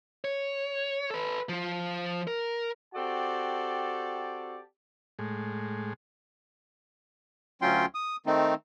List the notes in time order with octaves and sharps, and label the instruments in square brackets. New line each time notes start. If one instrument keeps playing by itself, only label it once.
[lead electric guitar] C#5
A4 B4
F3 F4
A#4
[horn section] C4 F#4 G4 A4 D5 A5
[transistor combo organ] A2 G#3
[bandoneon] D2 F#3 C#4 F4 G5 C6
D#6
D#3 A3 C4 D#4